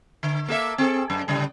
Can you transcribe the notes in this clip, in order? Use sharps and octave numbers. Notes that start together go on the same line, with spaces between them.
D3
A#3 A4 E5
C4 G#4 A4
F#2
A2 C#3 G3